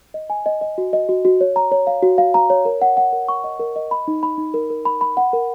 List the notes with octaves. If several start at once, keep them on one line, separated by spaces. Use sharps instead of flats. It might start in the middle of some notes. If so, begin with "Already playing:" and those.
D#5
G#5
D#5
D#5
F#4
D#5
F#4
F#4
C#5
A#5
C#5
F5
F#4
F5
A#5
C#5
A#4
F#5
F#5
A#4
C#6
D#5
A#4
D#5
B5
D#4
B5
D#4
A#4
A#4
B5
B5
F#5
A#4